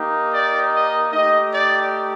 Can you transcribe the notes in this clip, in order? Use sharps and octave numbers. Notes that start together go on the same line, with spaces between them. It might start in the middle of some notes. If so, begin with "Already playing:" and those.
Already playing: A#3 D#4 G4
D5
D#5
A3 D#4 G4 D#5
D5